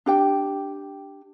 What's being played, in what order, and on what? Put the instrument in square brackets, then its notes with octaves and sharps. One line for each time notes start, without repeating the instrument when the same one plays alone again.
[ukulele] D4 G4 G5